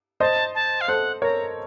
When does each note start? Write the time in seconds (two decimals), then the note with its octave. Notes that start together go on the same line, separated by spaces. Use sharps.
0.20 C5 D#5 A5
0.55 A5
0.81 F5
0.88 A4 C5 F#5
1.22 A#4 C#5 A#5